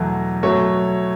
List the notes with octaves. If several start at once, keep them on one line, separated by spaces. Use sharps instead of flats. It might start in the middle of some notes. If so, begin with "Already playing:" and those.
Already playing: E2 B2 F#3 A3
B2 F#3 A3 C#5